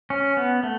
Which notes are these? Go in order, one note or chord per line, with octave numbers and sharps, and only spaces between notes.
C#4
B3
A3